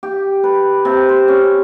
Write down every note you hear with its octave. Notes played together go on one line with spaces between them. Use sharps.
G4
B4
C3
C5
C#4